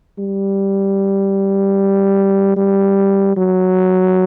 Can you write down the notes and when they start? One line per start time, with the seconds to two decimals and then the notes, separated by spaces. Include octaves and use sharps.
0.18 G3
2.57 G3
3.37 F#3